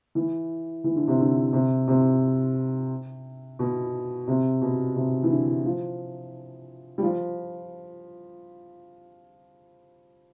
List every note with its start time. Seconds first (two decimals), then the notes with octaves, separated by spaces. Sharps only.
0.15 E3
0.84 E3
0.96 D3
1.08 C3
1.19 D3
1.53 C3
1.88 C3
3.59 B2
4.28 C3
4.62 B2
4.96 C3
5.23 E3
5.31 D3
5.65 F3
6.98 G3
7.02 F3